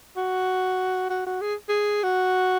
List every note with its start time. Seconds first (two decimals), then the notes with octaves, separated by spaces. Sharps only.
0.17 F#4
1.10 F#4
1.26 F#4
1.41 G#4
1.69 G#4
2.03 F#4